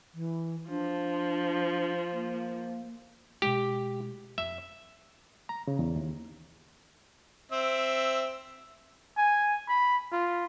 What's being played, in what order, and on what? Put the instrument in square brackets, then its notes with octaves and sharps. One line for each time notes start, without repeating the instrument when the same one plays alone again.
[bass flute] E3
[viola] F3 [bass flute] D4
[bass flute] A#3
[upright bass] B2 G#3 [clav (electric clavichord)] G4
[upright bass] F2 [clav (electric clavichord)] E5
[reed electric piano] A#5
C#3
E2
D#2
[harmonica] C4 E5
[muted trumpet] G#5
B5
F4